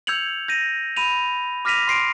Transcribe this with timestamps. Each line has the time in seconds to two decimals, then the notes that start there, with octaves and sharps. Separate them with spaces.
0.07 E6 G6 G#6 C#7 F7 F#7
0.48 G6 A#6 D#7
0.96 B5 D#7 F7
1.65 D6 F6 A#6 B6 D#7 F7
1.88 C6 C7 D7